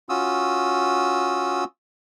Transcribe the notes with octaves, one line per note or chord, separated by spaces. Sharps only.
C#4 F4 F#4 D#6 E6